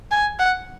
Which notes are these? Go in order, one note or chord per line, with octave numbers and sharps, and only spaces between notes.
G#5
F#5